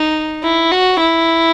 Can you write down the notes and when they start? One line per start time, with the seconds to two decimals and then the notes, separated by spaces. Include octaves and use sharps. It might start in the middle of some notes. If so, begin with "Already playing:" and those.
Already playing: D#4
0.43 E4
0.71 F#4
1.00 E4